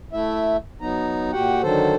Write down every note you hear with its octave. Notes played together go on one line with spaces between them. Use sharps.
A3 E4 E5
F#3 B3 D#4 A#5
A#2 F#4 G4 F#5 G5
D3 D#3 F#3 A4 C5